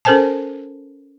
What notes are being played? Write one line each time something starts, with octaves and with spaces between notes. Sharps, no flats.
C#4 A4 A#4 C5 G#5 A5